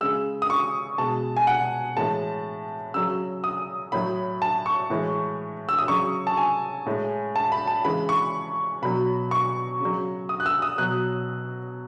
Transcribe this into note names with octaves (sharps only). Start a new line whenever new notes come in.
C#3 G#3 E6
D#6
C#6
B2 G#3 A5
G#5
F#5
A2 E3 G#3 A5
C#3 F#3 E6
D#6
A2 F#3 B5
A5
C#6
A2 E3 G#3
E6
D#6
C#3 F#3 C#6
A5
G#5
A2 G#3
A5
B5
A5
C#3 E3 G#3 B5
C#6
B2 F#3 B5
C#6
C#3 F#3
D#6
F#6
E6
D#6
B2 F#3 F#6